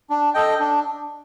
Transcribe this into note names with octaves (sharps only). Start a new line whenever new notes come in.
D4
A4 D#5 G5
D4